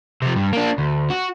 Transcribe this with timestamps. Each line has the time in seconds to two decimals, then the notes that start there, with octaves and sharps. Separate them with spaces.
0.22 C3 F3
0.36 G2
0.53 A#3 D4
0.78 D2
1.10 F#4